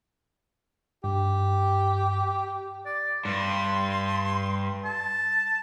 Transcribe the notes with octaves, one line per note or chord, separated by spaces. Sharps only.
G2 G4
D5
G2 C6
A5